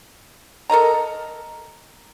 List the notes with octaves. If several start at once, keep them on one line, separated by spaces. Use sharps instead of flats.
A4 A#4 D#5 A#5